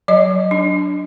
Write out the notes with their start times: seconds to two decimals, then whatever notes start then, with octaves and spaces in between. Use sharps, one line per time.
0.08 F#3 D#5
0.51 D4